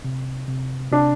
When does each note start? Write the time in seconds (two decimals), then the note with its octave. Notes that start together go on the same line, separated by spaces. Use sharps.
0.04 C3
0.48 C3
0.92 C3 D4